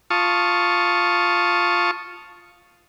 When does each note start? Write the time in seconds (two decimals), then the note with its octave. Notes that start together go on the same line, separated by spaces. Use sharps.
0.10 F4 A5 C#6 D#6